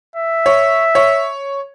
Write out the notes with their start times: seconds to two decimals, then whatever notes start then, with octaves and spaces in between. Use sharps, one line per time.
0.16 E5
0.46 C#5
0.95 C#5